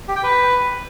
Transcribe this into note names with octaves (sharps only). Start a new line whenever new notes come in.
G4
G5
B4